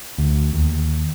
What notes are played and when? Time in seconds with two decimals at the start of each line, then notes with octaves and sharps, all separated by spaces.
0.18 D2
0.53 D#2